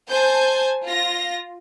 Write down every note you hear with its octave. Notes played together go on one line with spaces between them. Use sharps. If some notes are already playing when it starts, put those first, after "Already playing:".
C5 G#5 A5 G6
F4 A#6